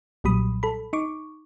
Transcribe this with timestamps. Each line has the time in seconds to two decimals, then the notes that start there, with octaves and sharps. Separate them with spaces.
0.24 B1 A#2 F#3 G3 B5 D#6
0.63 A4 B5
0.93 D#4 C#6 D6